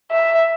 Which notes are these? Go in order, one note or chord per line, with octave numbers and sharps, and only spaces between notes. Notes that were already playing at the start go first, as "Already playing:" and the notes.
E5